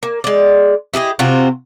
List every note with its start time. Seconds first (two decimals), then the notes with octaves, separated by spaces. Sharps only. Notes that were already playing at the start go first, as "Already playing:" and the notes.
0.03 A#3
0.24 G#3 D5
0.94 E4 G4 G#4 D#5
1.19 C3 C4 F4 F#4